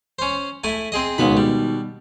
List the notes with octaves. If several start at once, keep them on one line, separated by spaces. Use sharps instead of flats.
C#4 C5
A3 E4 G#5
C4 G#4 D#5
C#2 B2 D#3 B3 B5
G3